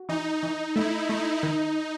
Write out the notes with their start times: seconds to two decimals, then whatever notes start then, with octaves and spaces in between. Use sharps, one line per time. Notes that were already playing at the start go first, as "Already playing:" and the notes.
Already playing: F#4
0.09 E3 D#4
0.42 E3 D#4
0.76 A3 E4
1.09 A3 D#4
1.42 D#3 D#4